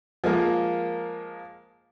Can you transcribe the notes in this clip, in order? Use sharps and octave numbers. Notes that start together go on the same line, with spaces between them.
F3 G#3 A#3 A#4